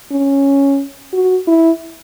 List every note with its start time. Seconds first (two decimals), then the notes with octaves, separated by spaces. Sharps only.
0.11 C#4
1.13 F#4
1.47 E4